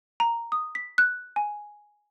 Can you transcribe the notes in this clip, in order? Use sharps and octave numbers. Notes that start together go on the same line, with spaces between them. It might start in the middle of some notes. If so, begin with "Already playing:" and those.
A#5
D#6
B6
F#6
G#5